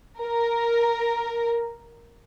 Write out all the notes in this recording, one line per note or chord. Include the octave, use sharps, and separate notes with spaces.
A#4